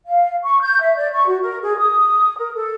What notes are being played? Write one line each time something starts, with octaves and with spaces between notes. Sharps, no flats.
F5
C#6
G6
E5
D5
C#6
F#4
A#4
G#4
D#6
A#4
A4